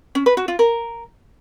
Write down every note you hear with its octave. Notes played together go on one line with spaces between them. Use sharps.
C#4
B4
F#4
F4
A#4